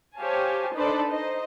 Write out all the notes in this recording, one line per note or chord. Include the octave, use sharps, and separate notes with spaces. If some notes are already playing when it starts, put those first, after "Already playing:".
G4 C5 C#5 F5 G#5 A5
D4 D#4 A4 B4 C5 D5
D#4 C5 D#5